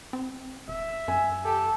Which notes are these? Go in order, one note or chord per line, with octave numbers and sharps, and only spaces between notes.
C4
E1 E5
F#2 G#5
G4 A4